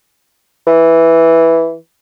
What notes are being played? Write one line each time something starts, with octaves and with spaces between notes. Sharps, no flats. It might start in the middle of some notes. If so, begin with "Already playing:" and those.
E3